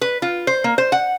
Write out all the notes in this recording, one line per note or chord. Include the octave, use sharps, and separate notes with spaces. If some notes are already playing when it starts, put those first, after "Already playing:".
B4
F4
C5
A#3
C5
F#5